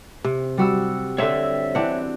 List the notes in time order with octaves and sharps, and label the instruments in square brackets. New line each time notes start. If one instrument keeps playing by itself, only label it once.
[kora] C3
[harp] G3 F#4 E6
[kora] D3 C4 [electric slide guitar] C#5 E5 [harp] E6
[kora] E3 D4 F#5 [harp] C4